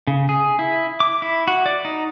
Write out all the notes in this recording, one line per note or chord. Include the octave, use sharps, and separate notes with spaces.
C#3
G#4
E4
D6
E4
F#4
D5
D#4